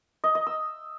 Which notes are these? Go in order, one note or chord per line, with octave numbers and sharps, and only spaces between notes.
D#5
D#5
E6